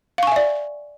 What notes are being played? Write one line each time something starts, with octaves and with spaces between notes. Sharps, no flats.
D5 E5 F5 G#5 C#6